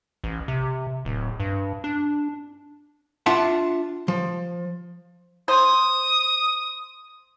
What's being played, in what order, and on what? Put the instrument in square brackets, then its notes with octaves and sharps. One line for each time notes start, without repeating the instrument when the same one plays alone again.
[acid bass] A1
C3
D1
G2
D4
[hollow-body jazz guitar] D4 F4 E5 F#5 A5
F3
[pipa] C5 [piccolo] D#6